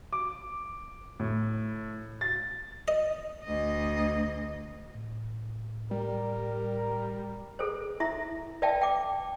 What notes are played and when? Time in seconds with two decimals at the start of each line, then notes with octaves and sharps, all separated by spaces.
0.13 D6
1.20 A2
2.21 A6
2.88 D#5
3.44 D2 D#5
4.95 A2
5.91 G3 A#4
7.59 G#4 A4 B4 C5
8.00 E4 E5 A#5
8.62 B4 D5 E5 F5 G5 A5
8.82 G5 D6